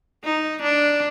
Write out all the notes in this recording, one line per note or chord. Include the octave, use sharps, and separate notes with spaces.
D#4
D4